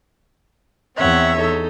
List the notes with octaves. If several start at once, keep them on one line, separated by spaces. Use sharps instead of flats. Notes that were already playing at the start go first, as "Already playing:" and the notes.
E2 C4 C#5 E5 F#5
D#4 A4